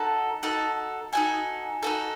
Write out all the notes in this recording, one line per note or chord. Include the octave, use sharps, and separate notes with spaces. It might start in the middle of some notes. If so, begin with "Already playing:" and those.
Already playing: D#4 F#4 A4 A5
D#4 F#4 A4
D#4 F#4 A4 G#5
D#4 F#4 A4